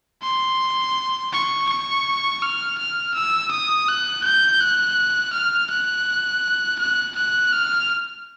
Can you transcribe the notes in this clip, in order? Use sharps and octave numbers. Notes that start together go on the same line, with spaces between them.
C6
C#6
C#6
F6
F6
E6
D#6
F#6
G6
F#6
F6
F#6
F#6
F#6
F6